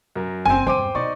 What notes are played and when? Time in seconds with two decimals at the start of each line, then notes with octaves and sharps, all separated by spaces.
0.16 F#2 A#4
0.45 F#1 C4 G#5
0.67 E2 G2 C5 G5 D6 D#7
0.95 B2 D#4 D5 C#6